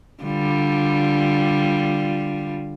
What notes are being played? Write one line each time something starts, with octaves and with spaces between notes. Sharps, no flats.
D3 G3 F4